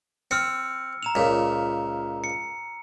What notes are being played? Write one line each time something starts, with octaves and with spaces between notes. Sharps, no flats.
C4 E6 F6 C#7
A#5 E7 F7
C#2 A#2
C#7